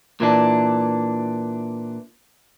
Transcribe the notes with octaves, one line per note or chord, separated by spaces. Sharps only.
A#2 E3 D4